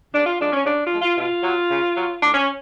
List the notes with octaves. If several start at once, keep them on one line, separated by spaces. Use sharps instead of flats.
C#3 D4
F4
F3 G#3 D4
C#4
C#3 D4
F4
F3 G#3
F4
B2 F4
F#3
C#3
F#3
A2 D4
C#4